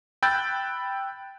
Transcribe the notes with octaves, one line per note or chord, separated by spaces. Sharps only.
G5 B5 E6 F#6 G6 A6